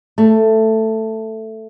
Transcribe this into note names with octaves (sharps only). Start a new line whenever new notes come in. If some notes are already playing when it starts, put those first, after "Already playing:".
A3